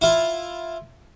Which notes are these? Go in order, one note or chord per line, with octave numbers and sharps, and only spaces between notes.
E4 F4